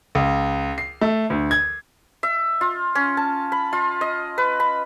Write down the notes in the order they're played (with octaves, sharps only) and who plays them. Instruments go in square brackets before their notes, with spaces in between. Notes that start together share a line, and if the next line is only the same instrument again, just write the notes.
[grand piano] C#2
C7
A3
D2
G#6
[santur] E5
F4
C#4
A5
B5
F4
D#5
B4
B5